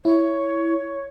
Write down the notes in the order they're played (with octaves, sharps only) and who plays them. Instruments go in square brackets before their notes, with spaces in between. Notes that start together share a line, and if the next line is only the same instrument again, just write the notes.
[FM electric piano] E4 [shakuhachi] C#5